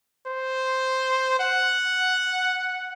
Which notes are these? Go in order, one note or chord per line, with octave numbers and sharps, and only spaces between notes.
C5
F#5